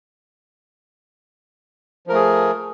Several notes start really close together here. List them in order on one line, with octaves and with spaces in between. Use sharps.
F3 A#4 A3 G#4